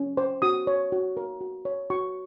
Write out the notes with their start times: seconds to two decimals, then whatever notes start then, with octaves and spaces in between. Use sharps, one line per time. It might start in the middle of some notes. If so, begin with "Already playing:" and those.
Already playing: C#4
0.17 C5
0.42 F#4 D#6
0.67 C#5
0.92 F#4
1.17 A#4
1.41 F#4
1.65 C#5
1.90 F#4 C#6